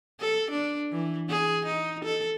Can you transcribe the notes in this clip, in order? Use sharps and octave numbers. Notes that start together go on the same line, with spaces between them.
A4
D4
E3
G#4
D#4
A4